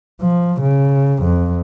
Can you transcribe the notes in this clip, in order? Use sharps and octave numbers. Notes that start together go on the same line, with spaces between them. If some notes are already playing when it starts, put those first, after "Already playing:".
F3
C#3
F2